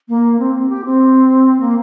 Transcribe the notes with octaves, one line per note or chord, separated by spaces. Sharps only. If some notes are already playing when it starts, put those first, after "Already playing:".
A#3
C4
C4
G4
C4
A#3